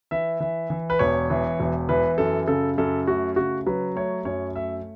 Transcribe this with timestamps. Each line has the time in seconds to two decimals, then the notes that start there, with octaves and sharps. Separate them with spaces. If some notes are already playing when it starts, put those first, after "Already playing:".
0.11 E3 E5
0.40 E3
0.70 E3
0.90 B4
0.99 E1 C#5
1.30 E3
1.60 E1
1.89 E3 B4
2.18 F#2 A4
2.48 C#3 A4
2.78 F#2 A4
3.07 A3 F#4
3.36 C#3 F#4
3.66 F#3 B4
3.96 A3 C#5
4.25 F#2 C#5
4.55 A3 E5